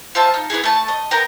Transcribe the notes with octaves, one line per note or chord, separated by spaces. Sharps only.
F4 C5 E5 A5
D#4
B3 D4 E4 G#4
A3 A5
D#5
B3 A#4 G5 A#5